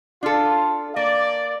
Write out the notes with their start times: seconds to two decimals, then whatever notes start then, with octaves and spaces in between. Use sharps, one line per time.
0.23 D4 F4 A4
0.96 A#3 D5